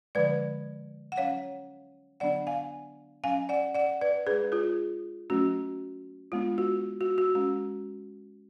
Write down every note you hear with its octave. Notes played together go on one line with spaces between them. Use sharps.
D3 F3 G#3 B4 D5
F#5
F#3 C#4 C#5 F5
D3 F#3 B3 D4 D5 F#5
F5 G#5
F#3 C#4 F5 G#5
D5 F#5
D5 F#5
B4 D5
G#3 D4 G#4 B4
F4 G#4
F#3 A3 C#4 F#4
G#3 B3 D4 F4
F#4
F#4
F#4
G#3 C#4 F#4